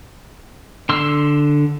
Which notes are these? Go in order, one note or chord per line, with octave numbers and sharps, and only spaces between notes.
D3 C6 E6